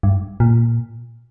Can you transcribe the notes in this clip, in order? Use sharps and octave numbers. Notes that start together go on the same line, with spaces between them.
G2
A#2